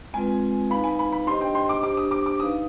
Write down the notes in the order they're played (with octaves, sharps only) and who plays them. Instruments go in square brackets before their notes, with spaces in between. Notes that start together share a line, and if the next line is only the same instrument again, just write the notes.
[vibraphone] G#3 C4 F4 B4 [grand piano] G#5
[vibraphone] D#4 B4 F5 [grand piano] B5
[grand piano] G#5
B5
B5
[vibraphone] D4 G4 C5 D#5 [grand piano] C6
[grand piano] G5
C6
D6
[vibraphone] D4 G4 C5 [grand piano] D6
[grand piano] D#6
D6
D6
[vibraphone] D#4 B4 F5 [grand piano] D#6